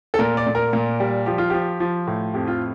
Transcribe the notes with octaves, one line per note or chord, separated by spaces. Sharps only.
A4
A#2 A#4
D5
A#2
A#4
A#2
G3
F3 G4
F4
F3 G4
F3
A2
F2 G4
F4